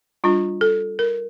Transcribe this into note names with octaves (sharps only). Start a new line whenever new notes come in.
G3 D4 F4
A4
A#4